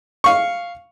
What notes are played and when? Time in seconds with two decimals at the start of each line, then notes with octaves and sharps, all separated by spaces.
0.24 F5 C#6